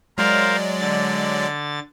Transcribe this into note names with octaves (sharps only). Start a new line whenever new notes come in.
F#3 G#3 A#4 C5 D5 F5
D3 A6